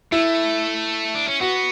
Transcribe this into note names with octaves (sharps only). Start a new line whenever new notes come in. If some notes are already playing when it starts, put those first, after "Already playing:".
A3 E4
D4
C#4
B3 F#4